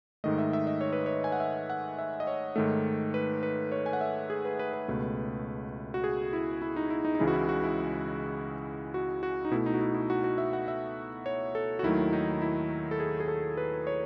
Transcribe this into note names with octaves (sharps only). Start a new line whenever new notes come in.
G#2 D#3 A3 D#5
E5
E5
D#5
C#5
B4
C#5
G#5
F#5
E5
F#5
E5
D#5
C#5
G#2 D#3 A3
B4
B4
C#5
G#5
F#5
E5
G#4
B4
B4
B4
C#2 B2 A3
F#4
G#4
E4
E4
D#4
E4
D#4
D#4
C#2 C#3 E3 G#3 E4
F#4
E4
F#4
E4
F#4
F#4
D#4
B2 A3 E4
D#4
F#4
E4
E4
F#4
F#4
E5
F#5
E5
C#5
A4
F#4
D#2 D#3 F#3 A3 E4
D#4
E4
A4
G#4
G#4
A4
B4
C#5